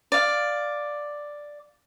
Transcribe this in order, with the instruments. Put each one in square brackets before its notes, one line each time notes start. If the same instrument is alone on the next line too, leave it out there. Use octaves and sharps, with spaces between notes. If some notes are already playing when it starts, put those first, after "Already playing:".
[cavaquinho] D5 F5